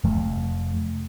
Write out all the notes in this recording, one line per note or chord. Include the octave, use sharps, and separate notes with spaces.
F1 F3 A3